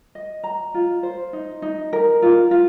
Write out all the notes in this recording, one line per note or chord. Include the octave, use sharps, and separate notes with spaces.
D#5
A#5
F4
C5
D#4
D#4
A#4
F4
F4